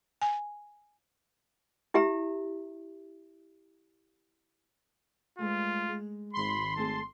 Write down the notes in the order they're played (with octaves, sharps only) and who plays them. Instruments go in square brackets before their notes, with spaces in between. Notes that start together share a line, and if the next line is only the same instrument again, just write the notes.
[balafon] G#5
[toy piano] E4 G4 E5 A#5
[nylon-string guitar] G2 G#3 A3 [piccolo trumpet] F4
[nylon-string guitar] G#3
[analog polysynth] G#1 C6 [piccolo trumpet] B5
[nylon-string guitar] A3 C4 G#4 [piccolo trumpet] A5